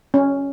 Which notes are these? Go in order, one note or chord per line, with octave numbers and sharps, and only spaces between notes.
C#4